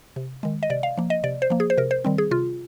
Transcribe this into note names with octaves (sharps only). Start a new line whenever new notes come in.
C3
D#3 G#3
D#5
C3 D5
F5
F3 A#3
D#5
C3 D5
C5
F3 A#3
G#4
C5
C3 A#4
C5
D#3 G3 C4
G#4
C3 F4